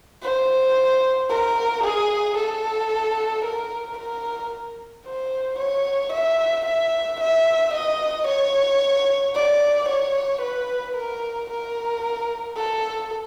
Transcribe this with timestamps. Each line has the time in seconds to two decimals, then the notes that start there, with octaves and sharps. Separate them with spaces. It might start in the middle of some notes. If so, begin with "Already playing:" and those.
0.23 C5
1.30 A#4
1.84 G#4
2.37 A4
3.45 A#4
3.99 A#4
5.05 C5
5.59 C#5
6.13 E5
6.66 E5
7.21 E5
7.74 D#5
8.28 C#5
9.35 D5
9.89 C#5
10.42 B4
10.96 A#4
11.50 A#4
12.57 A4